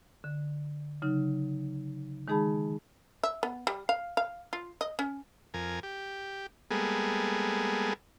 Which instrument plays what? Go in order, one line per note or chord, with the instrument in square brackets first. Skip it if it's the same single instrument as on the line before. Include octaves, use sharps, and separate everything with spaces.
[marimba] D3
C#3 F#3 D#4
D#3 G#3 D#4 G#4 A5 B5
[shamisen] E5
B3
G3
F5
F5
F4
D#5
C#4
[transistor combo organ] F2 A#4 G#5
G4
G3 G#3 A#3 B3 G#4 A4